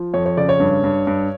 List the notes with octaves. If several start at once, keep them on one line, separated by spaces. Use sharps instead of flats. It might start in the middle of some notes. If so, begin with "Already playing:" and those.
Already playing: F3
F2 C#5
C#5
C#3 D5
C#5
G2
G2
G2